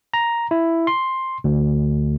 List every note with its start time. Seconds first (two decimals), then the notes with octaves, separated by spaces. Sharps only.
0.14 A#5
0.51 E4
0.87 C6
1.44 D2